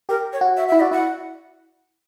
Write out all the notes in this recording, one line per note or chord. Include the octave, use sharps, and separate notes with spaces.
G4 A#4
C#5
F#4
E5
E4 E5
F#4 D5
E4 F#5